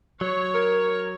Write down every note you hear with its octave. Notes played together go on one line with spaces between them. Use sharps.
F#3 C#5
A#4